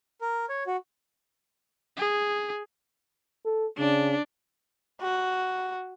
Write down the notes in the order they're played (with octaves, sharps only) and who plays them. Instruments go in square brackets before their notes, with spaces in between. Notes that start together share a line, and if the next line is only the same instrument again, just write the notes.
[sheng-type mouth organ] A#4
C#5
F#4
[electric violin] G#4
[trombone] A4
[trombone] C#3 [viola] D4
[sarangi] F#4